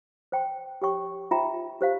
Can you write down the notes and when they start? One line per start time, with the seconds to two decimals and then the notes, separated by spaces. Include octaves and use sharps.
0.32 C5 G5 C6
0.82 G4 C#5 G5 C#6
1.31 F4 C5 E5 G5 A#5
1.81 G4 C5 F5